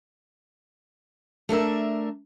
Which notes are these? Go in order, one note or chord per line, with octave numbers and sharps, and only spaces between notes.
A3 D4 A#4 E5